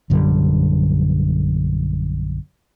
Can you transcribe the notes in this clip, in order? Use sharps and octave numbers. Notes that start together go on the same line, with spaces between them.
A#1 F#2 D3 G3